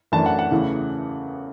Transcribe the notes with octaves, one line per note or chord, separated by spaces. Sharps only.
F#2 E3 A3 D4 A5
F#5
F#5
E2 C#3 E3 A3